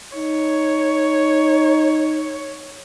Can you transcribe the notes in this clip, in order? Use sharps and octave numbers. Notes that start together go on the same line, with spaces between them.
D#4 C#5